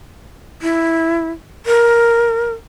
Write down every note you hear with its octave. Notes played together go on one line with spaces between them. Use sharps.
E4
A#4